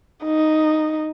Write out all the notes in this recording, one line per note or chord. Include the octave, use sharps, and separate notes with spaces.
D#4